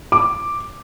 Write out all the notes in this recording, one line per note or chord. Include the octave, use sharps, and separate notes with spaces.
D6